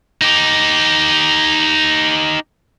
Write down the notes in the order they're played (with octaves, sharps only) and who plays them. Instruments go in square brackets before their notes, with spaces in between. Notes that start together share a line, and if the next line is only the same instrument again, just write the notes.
[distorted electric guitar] D#4 G4